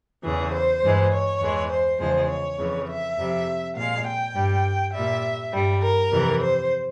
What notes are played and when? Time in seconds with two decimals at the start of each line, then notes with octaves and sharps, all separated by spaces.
0.23 E2 C#3 E3 G#4
0.52 C5
0.83 G2 E3 G#3
1.12 C#5
1.40 E2 E3 G#3
1.70 C5
1.99 E2 C#3 F3 G#3 C5
2.29 C#5
2.58 F2 C#3 E3
2.88 E5
3.18 F2 C3 G3
3.76 A#2 G#3 F5
4.06 G5
4.34 G2 G3
4.93 A#2 G3 E5
5.53 G2 G3
5.81 A#4
6.11 F2 C3 E3 G3
6.41 C5